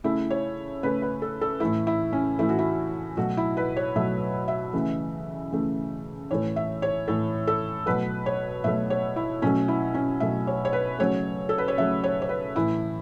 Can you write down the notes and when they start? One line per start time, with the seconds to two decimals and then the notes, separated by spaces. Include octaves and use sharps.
0.04 C#3 A3 E4
0.30 C#5
0.83 C#3 A3 B4
1.02 B4
1.22 A4
1.41 A4
1.60 A2 E3 A3 E4
1.87 E4
2.12 C#4
2.39 A2 E3 A3 E4
2.49 F#4
2.59 E4
3.17 B2 F#3 A3 F#4
3.37 E4
3.57 B4
3.76 C#5
3.96 B2 F#3 A3 E5
4.48 E5
4.73 C#3 E3 A3
5.52 C#3 E3 A3
6.31 A2 E3 A3 C#5
6.56 E5
6.82 C#5
7.08 A2 E3 A3 A4
7.47 A4
7.86 B2 F#3 A3 B4
8.26 C#5
8.64 B2 F#3 A3 E5
8.90 C#5
9.16 E4
9.42 B2 F#3 A3 C#4
9.68 E4
9.94 C#4
10.20 B2 F#3 A3 E5
10.47 C#5
10.65 C#5
10.73 B4
10.99 C#3 F#3 A3 C#5
11.49 A4
11.58 B4
11.68 C#5
11.77 C#3 F#3 A3 E5
12.04 C#5
12.22 C#5
12.29 B4
12.55 A2 E3 A3 E4